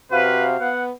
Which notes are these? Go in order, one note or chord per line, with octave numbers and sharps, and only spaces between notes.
C3 F#4 B4 C5 F5
B3 F#5